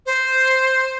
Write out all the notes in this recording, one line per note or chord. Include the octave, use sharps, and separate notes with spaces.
C5